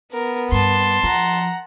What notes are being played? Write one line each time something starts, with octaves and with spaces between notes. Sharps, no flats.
B3 A#4
G2 A5 C6
F3 F#5 A#5